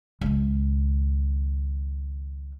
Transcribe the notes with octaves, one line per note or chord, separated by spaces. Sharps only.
C#2 D#3